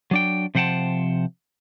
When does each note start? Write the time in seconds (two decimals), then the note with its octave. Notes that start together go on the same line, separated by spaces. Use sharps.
0.11 F#3 D4 G5
0.55 C3 F3 C5 F#5 G5 A5